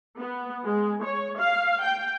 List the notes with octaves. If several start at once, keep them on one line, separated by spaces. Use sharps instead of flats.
B3
G#3
C#5
F5
G5